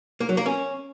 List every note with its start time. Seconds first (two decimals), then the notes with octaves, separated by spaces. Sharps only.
0.20 A#3
0.29 F#3
0.37 A#3
0.46 C#4